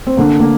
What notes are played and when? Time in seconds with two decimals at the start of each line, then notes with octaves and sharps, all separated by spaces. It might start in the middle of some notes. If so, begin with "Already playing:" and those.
0.07 C4
0.17 D3 A#3
0.40 A#3